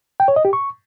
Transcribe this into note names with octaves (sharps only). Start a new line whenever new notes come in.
G5
C#5
D#5
G4
C#6